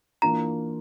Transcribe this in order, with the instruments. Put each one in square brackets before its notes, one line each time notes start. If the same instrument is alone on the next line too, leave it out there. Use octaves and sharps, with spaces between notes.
[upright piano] E3 A#3 D4 F4 [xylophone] A#5